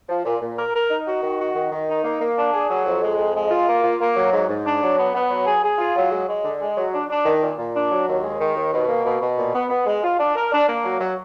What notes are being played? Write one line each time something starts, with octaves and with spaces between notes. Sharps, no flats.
F3
A#2
A#2
A#4
A#4
D#4
F#4
D#3
F#4
D#3
D#3
D#4
A#3
A#3
D4
G#4
F#3
F2
G#3
F2
G#3
F4
A#3
F4
A#3
F#3
G#2
G#2
D4
F#3
B3
B3
F#3
G#4
G#4
F4
F#3
G#3
G#3
D3
G#3
F#3
D4
D4
D#3
A#2
A#2
D4
F#3
D#2
G#3
D#3
D#2
B2
A#3
B2
B2
A#2
B3
B3
G#3
F4
D4
A#4
D4
A#3
F#3
F#3